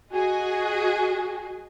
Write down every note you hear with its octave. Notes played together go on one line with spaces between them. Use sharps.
F#4 G#4 D#5 G#5